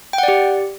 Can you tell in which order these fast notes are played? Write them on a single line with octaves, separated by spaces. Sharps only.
G5 F#5 D5 G4